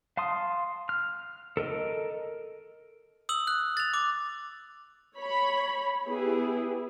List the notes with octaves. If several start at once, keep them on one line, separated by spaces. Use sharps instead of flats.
F5 A5 C6 D#6
F6
A4 A#4 D#5
D#6 E6 F#7
F#6
A6 F7
D6
C#5 B5
B3 E4 G4 G#4